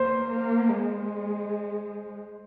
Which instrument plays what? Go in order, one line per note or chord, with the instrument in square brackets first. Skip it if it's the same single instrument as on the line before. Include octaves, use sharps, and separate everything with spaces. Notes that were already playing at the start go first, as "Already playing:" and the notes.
Already playing: [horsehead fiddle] A#3 [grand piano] C5
[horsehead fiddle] A#3
G#3